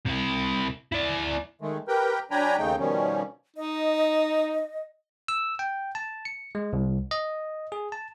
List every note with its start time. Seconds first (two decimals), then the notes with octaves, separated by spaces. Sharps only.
0.06 C3 E4
0.92 E4 D5
1.61 D#3 G#3 A3
1.88 G4 A#4 B4 G5
2.31 F#3 D4 G5 G#5 A#5 B5
2.58 D#2 C#3 A3 D#4 G5
2.79 B2 D#3 F3 G3 C#4
3.56 D#4 D#5
5.28 E6
5.59 G5
5.95 A5
6.25 C#7
6.55 G#3
6.73 C2
7.11 D#5
7.72 G#4
7.92 A5